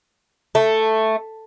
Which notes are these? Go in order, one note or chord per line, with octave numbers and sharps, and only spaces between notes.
A3